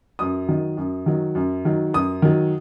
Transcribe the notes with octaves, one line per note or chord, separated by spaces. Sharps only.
F#2 D#6
D#3 F#3
F#2
D#3 F#3
F#2
D#3 F#3
F#2 D#6
D#3 F#3